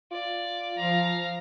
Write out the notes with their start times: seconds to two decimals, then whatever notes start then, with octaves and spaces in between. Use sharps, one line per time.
0.12 F4 D5
0.78 F3 F5 A#5